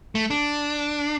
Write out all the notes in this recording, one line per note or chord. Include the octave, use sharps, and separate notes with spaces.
A3
D4